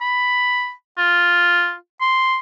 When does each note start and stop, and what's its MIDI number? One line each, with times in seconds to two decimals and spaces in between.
0.01 0.72 83
0.98 1.74 65
2.01 2.38 84